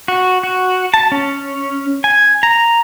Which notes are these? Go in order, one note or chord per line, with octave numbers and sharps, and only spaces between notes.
F#4
F#4
A5
C#4
G#5
A#5